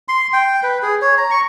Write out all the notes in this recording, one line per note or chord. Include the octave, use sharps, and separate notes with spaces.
C6
G5
B4
G#4
C#5
A#5
C#6